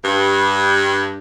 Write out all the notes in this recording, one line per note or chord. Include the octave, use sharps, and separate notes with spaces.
G2